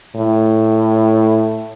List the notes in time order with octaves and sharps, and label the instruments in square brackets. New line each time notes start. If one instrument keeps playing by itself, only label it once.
[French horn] A2